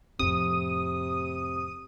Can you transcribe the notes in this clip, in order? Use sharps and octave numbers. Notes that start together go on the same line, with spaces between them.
F2 A2 C3 D#6